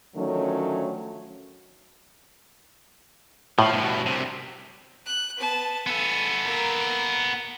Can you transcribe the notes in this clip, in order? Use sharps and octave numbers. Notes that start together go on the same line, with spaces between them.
D3 D#3 F3 F#3 A3 C#4
A2 F3
G2 B2
C2 C3
F#6
B3 A5
B3 A4 G#5
A#3 A#4